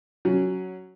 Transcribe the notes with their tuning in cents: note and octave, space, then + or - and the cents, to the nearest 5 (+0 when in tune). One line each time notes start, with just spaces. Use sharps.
F#3 +0 C#4 +0